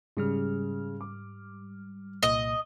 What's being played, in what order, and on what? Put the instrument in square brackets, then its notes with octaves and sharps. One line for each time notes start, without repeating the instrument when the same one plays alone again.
[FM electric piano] G#2 G3 F6 [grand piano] C#3
[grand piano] D6
[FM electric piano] C2 A#2 [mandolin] D#5